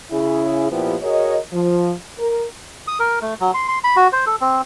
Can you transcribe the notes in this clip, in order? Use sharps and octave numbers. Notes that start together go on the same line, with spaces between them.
C#3 E4 G#4
A#2 F3 B3 E4 G4
F#4 G#4 A#4 C#5 D#5
F3
A#4
D#6
A#4
A3
F#3
C6
C6
B5
F#4
C5
A4
C4